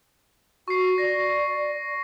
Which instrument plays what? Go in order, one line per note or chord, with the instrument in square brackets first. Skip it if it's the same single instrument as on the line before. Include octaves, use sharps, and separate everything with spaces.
[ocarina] F#4 [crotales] C#6 C7
[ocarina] D5 [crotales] A#6